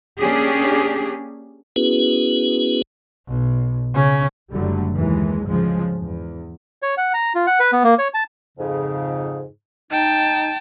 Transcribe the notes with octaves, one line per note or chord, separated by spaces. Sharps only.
A#3 C#4 D4 G4 G#4
B3 C#4 E4 F#4 G#4 B4
B1
C#3 C#4
F#1 D3 F#3 G3 A3
D#2 E3 G#3
D2 G#2 C#3 F3 G#3
E2
C#5
F#5
A#5
F4
F#5
B4
B3
A#3
C#5
A5
F2 G#2 C#3
D#4 G5 A5